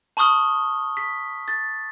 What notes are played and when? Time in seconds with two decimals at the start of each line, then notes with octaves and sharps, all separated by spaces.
0.17 A5 B5 C#6 D#6 F6 G7
0.97 B6
1.48 A6